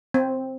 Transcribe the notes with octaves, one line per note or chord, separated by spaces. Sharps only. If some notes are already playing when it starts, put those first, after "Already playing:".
C4